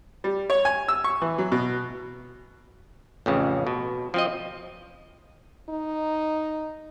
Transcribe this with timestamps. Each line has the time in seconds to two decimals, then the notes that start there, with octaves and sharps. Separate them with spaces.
0.24 G3
0.50 C#5
0.65 G#5
0.88 E6
1.04 C#6
1.22 E3
1.38 F#3
1.52 B2
3.26 A1 F2 C#3
3.67 B2
4.14 F3 C4 D#5
5.69 D#4